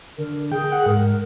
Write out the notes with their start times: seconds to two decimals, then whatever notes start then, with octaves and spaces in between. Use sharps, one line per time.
0.18 D3 A#4
0.52 G#4 G5
0.72 F#5
0.86 G#2 A#4